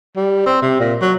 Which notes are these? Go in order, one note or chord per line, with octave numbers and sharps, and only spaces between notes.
G3
C4
C3
A#2
F#3